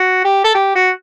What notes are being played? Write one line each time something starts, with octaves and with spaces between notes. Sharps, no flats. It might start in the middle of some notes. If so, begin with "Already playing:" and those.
Already playing: F#4
G4
A4
G4
F#4